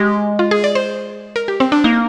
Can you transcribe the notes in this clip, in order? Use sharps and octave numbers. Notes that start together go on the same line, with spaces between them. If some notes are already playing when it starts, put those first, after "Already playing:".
Already playing: G#3 G4
F4
G#4
D5
C5
A#4
G4
C4
D4
A#3 D#4